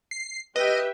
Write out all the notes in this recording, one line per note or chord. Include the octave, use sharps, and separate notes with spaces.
C7
G4 B4 D#5 E5 G5